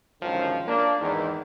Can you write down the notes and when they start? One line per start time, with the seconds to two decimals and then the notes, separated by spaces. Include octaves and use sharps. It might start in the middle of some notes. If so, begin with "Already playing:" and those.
0.22 C#2 F#2 D3 D#3 F3
0.67 A#3 D4
1.00 E2 G#2 D#3